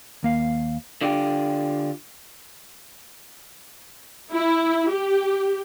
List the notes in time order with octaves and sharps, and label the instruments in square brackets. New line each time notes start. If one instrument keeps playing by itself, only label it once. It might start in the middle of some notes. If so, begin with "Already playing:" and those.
[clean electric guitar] D#2 A#3 F5
D3 D4 F4 G4
[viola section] E4
G4